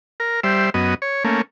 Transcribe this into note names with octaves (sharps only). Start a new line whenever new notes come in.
A#4
G3 C5 E5
F#2 B3 D#5
C#5
A3 A#3 C#4